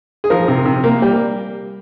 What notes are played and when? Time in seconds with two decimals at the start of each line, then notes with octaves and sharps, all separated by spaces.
0.24 G#4
0.30 F3 A#4
0.48 C3
0.65 C3
0.84 A#3
1.02 G3